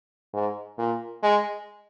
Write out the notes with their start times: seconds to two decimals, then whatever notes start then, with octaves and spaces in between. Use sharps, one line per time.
0.33 G#2
0.78 A#2
1.22 G#3